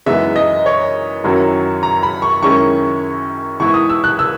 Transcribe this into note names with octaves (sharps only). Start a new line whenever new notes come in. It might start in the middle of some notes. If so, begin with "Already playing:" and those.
F#2 E3 G#3 B3 D#4 E5
D#5
C#5
F#2 D#3 F#3 C#4 E4
A#5
B5
C#6
F#2 D#3 G#3 C#4 E4 C#6
G#2 E3 B3 E4 C#6
D#6
E6
F#6
E6